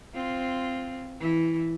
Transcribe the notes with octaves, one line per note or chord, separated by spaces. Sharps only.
C4 F4
E3 E4